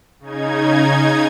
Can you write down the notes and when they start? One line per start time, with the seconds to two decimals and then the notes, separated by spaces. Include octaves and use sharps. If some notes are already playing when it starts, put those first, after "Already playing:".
0.20 C#3 D#4 G#6